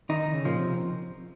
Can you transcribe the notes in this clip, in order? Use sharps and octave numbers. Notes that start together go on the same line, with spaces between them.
D#3 D#4
C#3
A#2 F3
C3